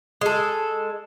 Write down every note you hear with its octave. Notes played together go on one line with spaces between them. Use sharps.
G#3 A4